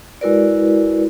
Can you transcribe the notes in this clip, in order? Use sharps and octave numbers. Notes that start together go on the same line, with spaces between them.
G#3 E4 F#4 A#4 B4 D5